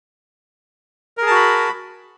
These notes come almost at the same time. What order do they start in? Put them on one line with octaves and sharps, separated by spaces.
A#4 G#4 A5 F#4 B5